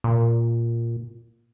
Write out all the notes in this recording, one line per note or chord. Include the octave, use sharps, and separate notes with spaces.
A#2